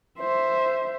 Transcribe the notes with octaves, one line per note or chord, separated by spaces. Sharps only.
C5 E5